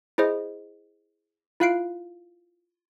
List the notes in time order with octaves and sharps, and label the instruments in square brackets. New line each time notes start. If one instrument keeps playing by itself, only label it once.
[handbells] E4 G#4 C5 D#5
E4 F4 F5 F#6 C7 D7